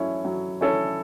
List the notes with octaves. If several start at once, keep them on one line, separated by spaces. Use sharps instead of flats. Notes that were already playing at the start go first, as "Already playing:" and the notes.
Already playing: F#3 C#4 E4 A4 C#5
F#3
C#4 E4 A4 C#5